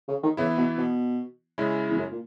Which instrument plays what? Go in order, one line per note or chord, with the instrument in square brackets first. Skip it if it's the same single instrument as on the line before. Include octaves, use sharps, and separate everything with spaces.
[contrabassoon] C#3
D#3
[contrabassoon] C#3 [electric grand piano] E3 B3 E4
[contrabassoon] B2
B2
[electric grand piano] C#3 G#3 C#4 E4
[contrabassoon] E2
F#2
A#2